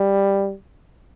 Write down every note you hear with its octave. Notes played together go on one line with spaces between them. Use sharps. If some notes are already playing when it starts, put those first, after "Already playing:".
Already playing: G3